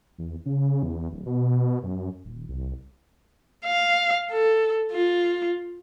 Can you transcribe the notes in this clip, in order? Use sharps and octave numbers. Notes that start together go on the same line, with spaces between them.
E2
C#3
E2
D1
B2
F#2
D#1
C2
F5
A4
F4